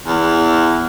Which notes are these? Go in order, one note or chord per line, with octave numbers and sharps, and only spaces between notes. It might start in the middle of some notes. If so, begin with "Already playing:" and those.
E2